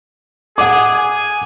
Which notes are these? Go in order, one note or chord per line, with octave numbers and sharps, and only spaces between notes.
G#4 F#5 D6
G#5